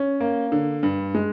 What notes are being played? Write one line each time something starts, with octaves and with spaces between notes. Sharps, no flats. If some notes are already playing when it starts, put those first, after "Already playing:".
Already playing: C#4
A#3
D3
G2
G#3